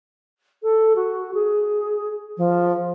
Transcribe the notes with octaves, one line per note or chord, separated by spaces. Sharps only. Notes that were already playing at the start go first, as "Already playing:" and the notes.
A4
F#4
G#4
F3